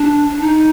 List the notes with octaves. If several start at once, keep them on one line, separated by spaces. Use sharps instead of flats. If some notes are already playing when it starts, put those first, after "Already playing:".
Already playing: D4
D4
D#4